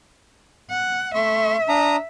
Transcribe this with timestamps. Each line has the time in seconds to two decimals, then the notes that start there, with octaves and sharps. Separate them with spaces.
0.70 F#5
1.15 A3 E5 C6 C#6
1.69 D4 A#5 D#6